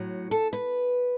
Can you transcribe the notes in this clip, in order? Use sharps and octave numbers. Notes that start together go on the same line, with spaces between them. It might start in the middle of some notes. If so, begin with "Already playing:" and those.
Already playing: A2 F#3
A4
B4